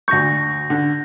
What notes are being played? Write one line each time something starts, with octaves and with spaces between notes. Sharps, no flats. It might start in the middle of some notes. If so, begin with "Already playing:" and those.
D2 C#6 G6 A#6
D3